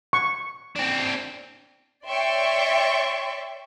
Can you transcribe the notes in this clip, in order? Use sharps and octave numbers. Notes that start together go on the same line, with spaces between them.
C#6
C4 D4
C#5 D5 E5 G5 C6 C#6